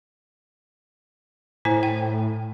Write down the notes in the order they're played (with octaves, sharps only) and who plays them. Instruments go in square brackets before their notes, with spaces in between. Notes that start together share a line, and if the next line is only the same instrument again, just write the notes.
[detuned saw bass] A2 [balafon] E4 C5 G#5
[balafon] G5